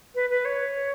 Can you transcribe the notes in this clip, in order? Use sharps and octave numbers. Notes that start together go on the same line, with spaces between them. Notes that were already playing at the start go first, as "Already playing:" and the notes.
B4
B4
C#5